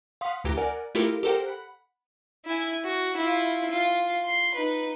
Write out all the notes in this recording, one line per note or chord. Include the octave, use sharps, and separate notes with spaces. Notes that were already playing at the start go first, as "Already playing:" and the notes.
F5 F#5 C6 D#6 B6
D2 E3 G4 A#5 A#6
A#4 D5 F#5 G#5
A3 E4 F4 G4 A4 A#4
G4 A4 A#4 C5 F#5 G5
F#5 B5
E4 G#5
F#4
E4 F4
F4
C6
D#4 B4